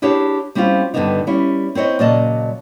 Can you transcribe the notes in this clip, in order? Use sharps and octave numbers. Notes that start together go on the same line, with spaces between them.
D4 E4 G4 G#4 C#5
G3 C4 C#4 E4 F4
G2 D3 D#3 B3 D4 D#4
G3 C#4 E4
C4 E4 C#5 D#5
A#2 C#3 F#3 D5 D#5 A5